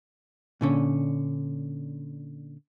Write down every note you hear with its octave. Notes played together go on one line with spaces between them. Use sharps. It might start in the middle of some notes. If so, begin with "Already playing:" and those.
A#2 D3 C#4